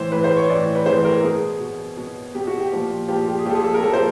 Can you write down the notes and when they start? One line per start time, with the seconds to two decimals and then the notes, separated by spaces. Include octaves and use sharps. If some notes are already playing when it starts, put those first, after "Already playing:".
Already playing: A2 E3 C5
0.12 A2 E3 B4
0.24 C5
0.37 C#5
0.49 A2 E3 D5
0.75 B4
0.86 A2 E3 C5
1.05 A#4
1.23 B2 G#4
1.60 B2
1.97 B2
2.34 B2 G4
2.47 F#4
2.59 G4
2.72 A#2 F3
3.08 A#2 F3 G4
3.28 G4
3.39 G#4
3.45 A#2 F3 G4 A4
3.55 G#4
3.64 A4
3.74 A#4
3.83 A#2 F3 A4
3.93 C5